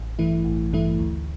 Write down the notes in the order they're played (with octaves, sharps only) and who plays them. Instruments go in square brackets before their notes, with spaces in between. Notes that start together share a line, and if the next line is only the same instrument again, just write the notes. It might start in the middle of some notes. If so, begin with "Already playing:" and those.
Already playing: [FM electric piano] A1
G2 E3 A3 E4
A1
G2 E3 A3 E4
D2